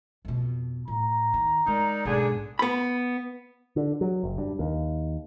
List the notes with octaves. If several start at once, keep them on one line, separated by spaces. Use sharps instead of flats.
F2 B2
A2 A#5
D#3
G#3 D#4 A#4 D5
B1 G#2 D3 D4 G#4
B3 B5
D3
F#3
F#1
G2
D#2